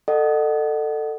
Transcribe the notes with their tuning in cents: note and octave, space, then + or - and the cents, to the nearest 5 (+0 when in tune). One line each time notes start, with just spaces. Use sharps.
A4 +15 D#5 -40 F#5 +10